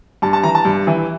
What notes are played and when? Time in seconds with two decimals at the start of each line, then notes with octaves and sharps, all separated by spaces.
0.22 G2 A5
0.33 A5
0.43 E3 A#5
0.55 A5
0.65 G2
0.87 E3